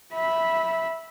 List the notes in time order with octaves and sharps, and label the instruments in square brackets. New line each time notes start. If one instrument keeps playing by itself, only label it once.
[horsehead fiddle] E5 B5